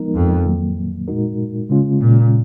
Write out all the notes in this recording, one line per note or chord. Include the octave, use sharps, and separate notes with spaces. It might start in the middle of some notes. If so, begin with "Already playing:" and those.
Already playing: F3 G#3 B3 D#4 A#4
F2
D#3 F#3 A#3
A#2 G#3 D#4 F#4 A#4
C#3 G#3 C#4 F4
A#2